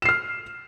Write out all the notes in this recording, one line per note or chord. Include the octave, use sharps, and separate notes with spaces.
F6 C7 E7